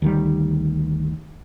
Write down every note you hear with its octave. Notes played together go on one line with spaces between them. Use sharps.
D2 D#3 G3